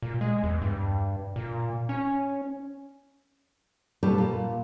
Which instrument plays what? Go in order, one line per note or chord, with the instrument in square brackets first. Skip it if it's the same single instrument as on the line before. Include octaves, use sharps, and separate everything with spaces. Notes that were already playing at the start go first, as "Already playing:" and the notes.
[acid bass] A#2
G#3
E2
G2
A#2
C#4
[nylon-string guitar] B2 G3 G4 A4
A#2